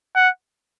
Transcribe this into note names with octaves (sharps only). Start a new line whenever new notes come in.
F#5